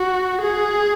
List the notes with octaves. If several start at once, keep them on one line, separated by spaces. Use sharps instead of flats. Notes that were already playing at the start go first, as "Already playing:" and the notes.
Already playing: F#4
G#4